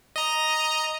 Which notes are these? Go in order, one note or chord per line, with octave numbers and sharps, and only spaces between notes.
D#5 A#5